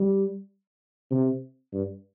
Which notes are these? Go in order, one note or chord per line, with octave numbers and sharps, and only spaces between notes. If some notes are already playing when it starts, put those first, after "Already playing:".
Already playing: G3
C3
G2